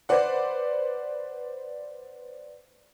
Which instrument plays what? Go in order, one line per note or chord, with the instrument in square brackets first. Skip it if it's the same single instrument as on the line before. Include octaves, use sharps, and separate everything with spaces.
[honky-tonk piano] B4 C5 D5 F#5